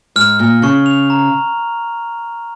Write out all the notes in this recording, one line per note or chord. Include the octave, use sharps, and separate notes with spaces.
G#2 F6
A#2 F6
C#3 C#6
F7
A#5